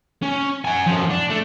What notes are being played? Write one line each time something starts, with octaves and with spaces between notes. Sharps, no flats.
C#4
F#5 G#5
F#2 F3
D4
A3